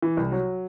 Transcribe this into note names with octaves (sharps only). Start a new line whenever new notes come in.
E3
C2
F#3